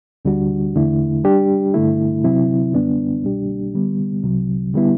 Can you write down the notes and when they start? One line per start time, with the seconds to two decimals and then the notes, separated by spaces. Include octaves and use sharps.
0.25 D2 D3 G3 D4 F#4
0.74 E2 D3 A3 E4
1.24 G3 D4 G4
1.74 G2 D3 A3 E4
2.24 C3 F#3 C4 E4
2.74 F#2 D3 G3 B3 D4
3.24 C2 B2 G3 D4 G4
3.74 D3 G3 B3
4.23 C2 C3 F#3
4.74 D3 G3 B3 E4